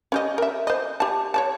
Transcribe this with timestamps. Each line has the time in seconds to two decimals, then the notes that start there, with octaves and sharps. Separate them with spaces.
0.12 C#4 G4 D#5
0.38 A#4 E5
0.67 C5 D#5
1.00 G4 A5
1.34 C#5 D5 A5